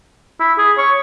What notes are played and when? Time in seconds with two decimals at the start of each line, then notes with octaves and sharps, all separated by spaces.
0.40 E4
0.58 G#4
0.78 C#5